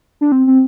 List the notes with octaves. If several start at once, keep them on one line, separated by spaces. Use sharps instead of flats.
D4
C4
C4